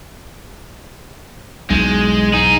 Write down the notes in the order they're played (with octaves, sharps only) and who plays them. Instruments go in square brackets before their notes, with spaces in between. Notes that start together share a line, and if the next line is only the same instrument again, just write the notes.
[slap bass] B1 E2 [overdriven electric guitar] G#3
[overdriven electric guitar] D#4 G#4